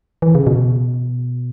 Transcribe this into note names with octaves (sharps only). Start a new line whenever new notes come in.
E3
C#3
B2